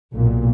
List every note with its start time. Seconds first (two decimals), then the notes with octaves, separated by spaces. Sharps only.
0.13 B1 A#2